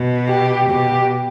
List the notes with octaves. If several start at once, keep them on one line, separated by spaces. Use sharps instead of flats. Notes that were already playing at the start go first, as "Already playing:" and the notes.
Already playing: B2
G4
B2 G4